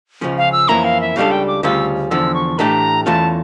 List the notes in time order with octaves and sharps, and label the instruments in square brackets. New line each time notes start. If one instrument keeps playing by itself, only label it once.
[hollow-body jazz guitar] C#2 C#3 F3 C#4
[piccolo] F5
E6
[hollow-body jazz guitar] F2 E3 A#3 C#4 E4 [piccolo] A#5
[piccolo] F5
E5
[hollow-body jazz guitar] C#2 C#3 G3 D4 A4 [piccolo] F5
[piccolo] G5
D6
[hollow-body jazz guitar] D2 C#3 G3 C#4 F4 [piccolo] E6
[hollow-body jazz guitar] E2 D3 F3 [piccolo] E6
[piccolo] C#6
[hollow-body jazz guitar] A2 E3 A3 D4 G4 [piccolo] A#5
[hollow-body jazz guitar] E2 E3 A3 C#4 F4 [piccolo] A5